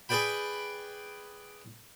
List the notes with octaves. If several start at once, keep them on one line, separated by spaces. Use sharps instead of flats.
G#4 B4 D5 G5 B5